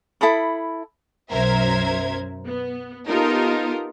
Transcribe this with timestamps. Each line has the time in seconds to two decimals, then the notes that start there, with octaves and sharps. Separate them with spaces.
0.21 E4 A4 B5 D#6
1.30 B1 F#2 A#4 C5 E5 G#6
2.45 B3
3.07 B3 D#4 F4 G4 A4 A#4